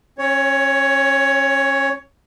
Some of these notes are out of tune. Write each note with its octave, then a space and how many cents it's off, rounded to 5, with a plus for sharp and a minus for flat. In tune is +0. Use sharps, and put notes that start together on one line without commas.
C#4 -30 C#5 +10